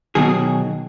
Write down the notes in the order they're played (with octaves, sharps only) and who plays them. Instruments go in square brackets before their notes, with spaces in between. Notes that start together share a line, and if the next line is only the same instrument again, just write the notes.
[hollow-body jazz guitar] B2 D#3 F#3 G#4